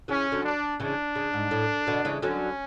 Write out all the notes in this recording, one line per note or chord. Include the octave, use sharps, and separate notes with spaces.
C#3 E3 C#4
D3 F#3
D4
C#3 E3 D4
C#3
G#2
A2
B2 D3
C#3 E3
D3 F#3 C#4